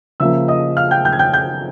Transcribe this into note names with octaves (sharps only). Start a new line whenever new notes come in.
C#3 F3 A#3 E5 E6
D#5 D#6
F5 F6
G5 G6
G5 G6
G#6
G5 G6
G5 G6